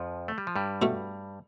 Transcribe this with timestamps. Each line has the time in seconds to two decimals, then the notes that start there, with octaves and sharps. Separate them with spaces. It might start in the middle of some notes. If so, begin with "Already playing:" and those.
Already playing: F2 F3
0.28 A3
0.38 G3
0.47 F3
0.56 G2 G3
0.82 B2 A3 E4